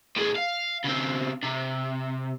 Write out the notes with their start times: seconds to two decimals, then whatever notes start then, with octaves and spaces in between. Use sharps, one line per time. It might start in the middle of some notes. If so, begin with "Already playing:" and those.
0.16 A2 G#4
0.36 F5
0.85 C#3 C4
1.44 C3